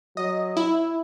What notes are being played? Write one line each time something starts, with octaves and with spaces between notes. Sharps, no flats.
F#3 D#5
E4